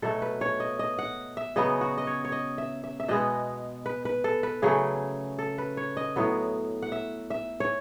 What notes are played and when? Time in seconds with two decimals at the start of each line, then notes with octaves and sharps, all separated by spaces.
0.02 B2 F#3 A3 A4
0.22 B4
0.41 C#5
0.60 D#5
0.79 D#5
0.99 F#5
1.37 E5
1.56 C#3 F#3 B3 D#5
1.81 F#4
1.98 D#5
2.07 C#5
2.25 C#5
2.32 D#5
2.58 E5
2.84 E5
3.00 E5
3.08 B2 G#3 B3 D#5
3.86 B4
4.05 B4
4.24 A4
4.43 B4
4.62 C#3 F#3 A3 G#4
5.39 A4
5.58 B4
5.77 C#5
5.97 D#5
6.16 A2 F#3 B3
6.83 F#5
6.92 E5
7.30 E5
7.60 C#5